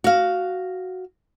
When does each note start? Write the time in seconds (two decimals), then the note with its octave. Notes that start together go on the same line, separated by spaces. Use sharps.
0.04 F#4 F5